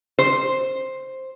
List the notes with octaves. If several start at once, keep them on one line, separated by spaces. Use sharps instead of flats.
C5